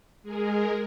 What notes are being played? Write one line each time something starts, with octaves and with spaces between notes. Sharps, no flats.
G#3 G#4 A#4